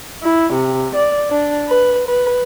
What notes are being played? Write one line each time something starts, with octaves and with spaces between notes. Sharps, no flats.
E4
C3
D5
D4
B4
B4